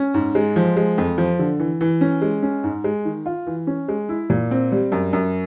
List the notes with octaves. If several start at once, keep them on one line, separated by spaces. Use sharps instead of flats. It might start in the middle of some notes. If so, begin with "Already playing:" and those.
Already playing: C#4
G#2
G#3
F3
G#3
F2
F3
D3
E3
E3
C#4
G#3
C#4
G#2
G#3
D#3
F4
E3
C#4
G#3
E4
A#2
C4
G3
F#2
F#2